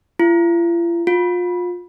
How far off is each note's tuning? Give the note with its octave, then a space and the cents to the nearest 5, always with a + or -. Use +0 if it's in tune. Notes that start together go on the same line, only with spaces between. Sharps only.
F4 -45
F4 +30